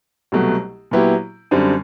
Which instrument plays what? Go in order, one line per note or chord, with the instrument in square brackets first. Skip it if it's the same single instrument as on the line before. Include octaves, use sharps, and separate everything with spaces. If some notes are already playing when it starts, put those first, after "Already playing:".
[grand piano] C2 B2 F#3 A3
A#2 F#3 B3 E4 G4
F#2 D3 G3 C4